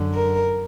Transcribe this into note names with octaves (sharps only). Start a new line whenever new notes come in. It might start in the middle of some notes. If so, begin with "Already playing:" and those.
Already playing: F#2 D3
A#4